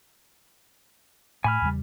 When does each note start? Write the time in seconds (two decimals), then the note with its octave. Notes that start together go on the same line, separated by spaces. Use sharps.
1.44 A2 G#5 B5 F6
1.62 E2 C#3 G3